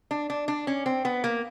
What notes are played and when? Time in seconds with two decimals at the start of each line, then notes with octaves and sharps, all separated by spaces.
0.11 D4
0.30 D4
0.48 D4
0.67 C#4
0.86 C4
1.05 B3
1.24 A#3